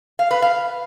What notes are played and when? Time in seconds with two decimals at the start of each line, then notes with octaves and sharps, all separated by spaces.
0.19 F5
0.31 B4
0.42 F5